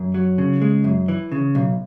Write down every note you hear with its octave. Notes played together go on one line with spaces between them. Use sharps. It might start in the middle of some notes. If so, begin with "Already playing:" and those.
Already playing: F#2
F#3
C#3
G#3
F#2
E3
C#3
B1